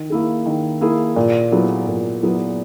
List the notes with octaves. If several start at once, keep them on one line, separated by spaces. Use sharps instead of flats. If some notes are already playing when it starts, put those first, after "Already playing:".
Already playing: D#3
A#3 E4 G#4
D#3
A#3 E4 G#4
A#2
F#3 B3 E4 G#4
A#2
F#3 B3 E4 G#4